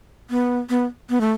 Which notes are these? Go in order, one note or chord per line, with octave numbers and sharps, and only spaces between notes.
B3
B3
B3
A3